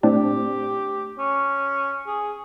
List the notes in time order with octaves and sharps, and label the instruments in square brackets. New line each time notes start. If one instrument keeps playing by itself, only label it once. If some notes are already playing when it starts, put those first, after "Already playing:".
[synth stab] A2 C4 D4 [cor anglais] G4
[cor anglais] C#4
G#4